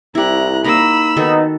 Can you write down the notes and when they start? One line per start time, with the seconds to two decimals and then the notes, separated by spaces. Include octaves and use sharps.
0.15 C2 E4 G4 A#5 F#6
0.64 A#3 D#4 A#5 B5 E6
1.17 D#3 B3 D#4 F#4 A4